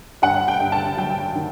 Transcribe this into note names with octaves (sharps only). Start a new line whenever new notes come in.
G2 F#5
G5
G2
A5
F#3 G5
D#3